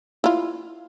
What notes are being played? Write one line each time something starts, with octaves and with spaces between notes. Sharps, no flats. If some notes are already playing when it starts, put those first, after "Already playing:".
E4 F4